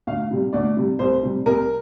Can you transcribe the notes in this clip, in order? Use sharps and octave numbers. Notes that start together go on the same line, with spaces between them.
D2 F5
C3 G3
D2 D5
C3 G3
C2 C5
C3 G3
C2 A#4